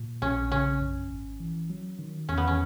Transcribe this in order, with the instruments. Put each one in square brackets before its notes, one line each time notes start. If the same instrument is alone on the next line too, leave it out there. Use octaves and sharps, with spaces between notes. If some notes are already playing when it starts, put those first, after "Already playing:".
Already playing: [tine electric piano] A#2
[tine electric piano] A#1 [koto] C#4
[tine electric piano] C#3 [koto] C#4
[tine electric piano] F#2
G#1
E3
F#3
D#3
[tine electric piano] E2 [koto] C#4
[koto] B3
C#4